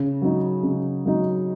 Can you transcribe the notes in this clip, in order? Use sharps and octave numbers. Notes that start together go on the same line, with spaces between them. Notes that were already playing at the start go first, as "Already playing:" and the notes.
Already playing: C#3
F#3 D#4
C#3
F#3 D#4